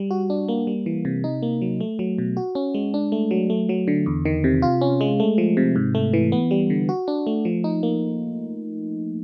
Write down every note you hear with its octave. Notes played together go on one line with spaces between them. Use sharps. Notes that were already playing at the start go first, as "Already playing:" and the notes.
Already playing: G3
F#4
D4
A#3
G3
E3
C3
D#4
A#3
F#3
A3
F#3
B2
F#4
C#4
G#3
D4
A3
F#3
A3
F#3
D3
E2
D#3
C3
F4
C#4
G#3
A3
F3
C3
G#2
A3
E3
B3
G3
D3
F#4
D4
A3
F3
D#4
A#3